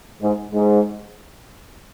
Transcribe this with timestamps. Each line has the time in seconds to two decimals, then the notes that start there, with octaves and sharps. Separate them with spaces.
0.21 G#2
0.51 G#2